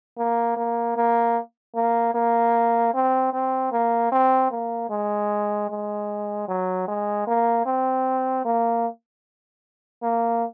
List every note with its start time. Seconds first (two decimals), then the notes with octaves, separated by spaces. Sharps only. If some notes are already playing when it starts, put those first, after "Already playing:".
0.18 A#3
0.57 A#3
0.96 A#3
1.75 A#3
2.14 A#3
2.94 C4
3.33 C4
3.72 A#3
4.12 C4
4.51 A#3
4.90 G#3
5.70 G#3
6.48 F#3
6.88 G#3
7.27 A#3
7.65 C4
8.45 A#3
10.03 A#3